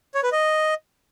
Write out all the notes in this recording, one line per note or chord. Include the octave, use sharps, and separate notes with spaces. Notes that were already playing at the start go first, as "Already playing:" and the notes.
C#5
B4
D#5